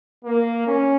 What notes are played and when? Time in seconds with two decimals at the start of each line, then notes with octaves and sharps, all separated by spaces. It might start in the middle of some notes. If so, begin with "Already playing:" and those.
0.24 A#3
0.67 C#4